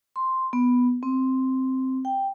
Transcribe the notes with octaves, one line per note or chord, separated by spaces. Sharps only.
C6
B3
C4
G5